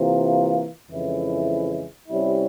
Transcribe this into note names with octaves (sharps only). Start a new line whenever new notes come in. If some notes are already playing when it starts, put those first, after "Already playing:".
Already playing: C3 E3 A#3 F4
F2 C#3 E3 G#3 E4
C3 G3 C#4 E4